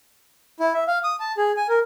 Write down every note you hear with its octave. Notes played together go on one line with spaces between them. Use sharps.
E4
E5
F5
D#6
A5
G#4
G#5
A#4